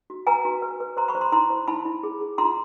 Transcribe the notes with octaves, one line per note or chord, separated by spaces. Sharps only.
F#4
B4 G#5 A#5
F#4
B4
B4
C5 A#5 C6
B5 C#6
C5
A#5 C6
E4 A#5 C6
C5
E4 A5 B5
E4
G#4
G#4
F4 A#5 C6